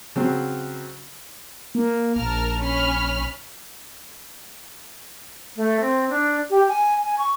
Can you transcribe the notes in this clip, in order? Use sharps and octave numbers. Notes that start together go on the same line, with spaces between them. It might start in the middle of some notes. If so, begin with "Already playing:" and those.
C#3 F#3 C4
A#3
A#1 A#4 A5 F6
C#4 B5 F6
A3
C4
D4
G4
G#5
G#5
C#6